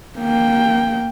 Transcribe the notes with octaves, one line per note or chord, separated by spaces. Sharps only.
A#3 G5